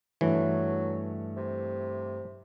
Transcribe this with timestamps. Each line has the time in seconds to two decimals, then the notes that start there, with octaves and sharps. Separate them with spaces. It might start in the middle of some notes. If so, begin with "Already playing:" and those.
0.21 G2 E3 F#3 A3
1.36 C3